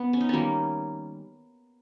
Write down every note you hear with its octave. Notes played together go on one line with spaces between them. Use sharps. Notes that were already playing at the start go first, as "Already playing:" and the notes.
Already playing: B3
C#4
D#4
D#3 G3 A#3 C#4